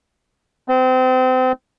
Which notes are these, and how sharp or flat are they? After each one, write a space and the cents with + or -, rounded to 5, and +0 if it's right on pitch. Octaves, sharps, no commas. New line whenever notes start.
C4 -30